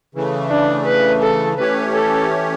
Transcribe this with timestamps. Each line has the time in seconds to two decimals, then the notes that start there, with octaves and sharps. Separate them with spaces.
0.15 C#3 E3 A3
0.50 D4
0.86 B4
1.22 A4
1.58 E3 A3 C#4 G4 B4 C#5
1.94 A4